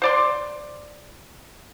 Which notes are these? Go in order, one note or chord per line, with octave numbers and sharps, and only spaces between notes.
C5 D5 C6